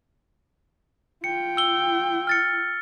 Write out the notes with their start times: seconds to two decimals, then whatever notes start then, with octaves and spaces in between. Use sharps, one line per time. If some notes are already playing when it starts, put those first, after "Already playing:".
1.24 F4 G5 C#7
1.57 E6 G7
2.27 F6 A6 C#7